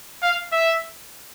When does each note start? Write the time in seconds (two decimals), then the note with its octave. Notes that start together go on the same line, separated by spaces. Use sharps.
0.23 F5
0.52 E5